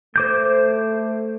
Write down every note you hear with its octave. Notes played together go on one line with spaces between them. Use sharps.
A3 C5 D6 G6